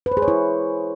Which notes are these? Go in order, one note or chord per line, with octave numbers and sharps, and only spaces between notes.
B4
C5
G#4
C#5
E4